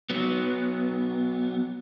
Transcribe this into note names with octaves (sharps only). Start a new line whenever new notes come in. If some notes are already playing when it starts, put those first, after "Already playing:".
F#3 B3